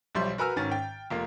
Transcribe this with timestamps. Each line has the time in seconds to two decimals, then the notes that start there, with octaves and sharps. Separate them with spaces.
0.15 B1 F3 G3 E5 C6 G6
0.38 F#4 A#4 B4 G#5 E6 F6
0.56 G#1 D#3 C#4 A6
0.72 G5
1.10 F1 A#3 F4